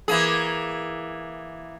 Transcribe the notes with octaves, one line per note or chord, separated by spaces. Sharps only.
E3 A#3 G#4